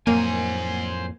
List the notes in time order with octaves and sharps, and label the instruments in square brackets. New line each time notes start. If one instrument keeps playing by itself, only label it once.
[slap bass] F2 A2 F#3 [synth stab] A#3 [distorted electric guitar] C5 G#5